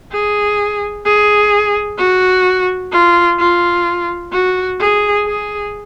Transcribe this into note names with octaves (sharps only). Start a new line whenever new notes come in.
G#4
G#4
F#4
F4
F4
F#4
G#4
G#4